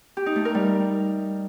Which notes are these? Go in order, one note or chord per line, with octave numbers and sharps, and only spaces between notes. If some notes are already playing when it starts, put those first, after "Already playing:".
G4
D#4
A3
A#4
G3